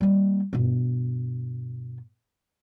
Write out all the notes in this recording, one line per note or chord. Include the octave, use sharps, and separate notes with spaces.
G3 A#3
G2 B2